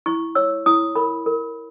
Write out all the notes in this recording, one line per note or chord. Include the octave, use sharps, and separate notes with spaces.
E4 C#6
C#5 E6
E4 D#6
A#4 B5
A#4